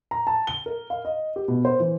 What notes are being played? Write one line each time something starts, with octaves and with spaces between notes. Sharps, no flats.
A#5
A5
G7
A#4
F5
D#5
G4
B2
C5
E3